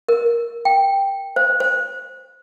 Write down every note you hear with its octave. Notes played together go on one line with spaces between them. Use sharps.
A#4
G5
C5
C5